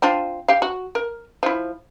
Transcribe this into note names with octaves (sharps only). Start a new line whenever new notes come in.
C4 D4 F4
G4 F5
F#4
A#4
F3 E4